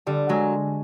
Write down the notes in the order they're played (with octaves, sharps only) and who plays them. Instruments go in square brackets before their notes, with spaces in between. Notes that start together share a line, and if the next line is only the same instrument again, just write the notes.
[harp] D3 [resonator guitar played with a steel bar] G3
[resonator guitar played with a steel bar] F#3 [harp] G#3